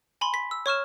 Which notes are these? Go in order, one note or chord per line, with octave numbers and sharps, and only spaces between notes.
G#5 B5 C6
B6
E6
C#5 C#6 F6 E7